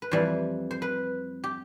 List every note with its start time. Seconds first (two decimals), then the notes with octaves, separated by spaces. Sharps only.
0.02 B4
0.11 F2 E3 G3 C5
0.71 C5
0.82 B4
1.44 G4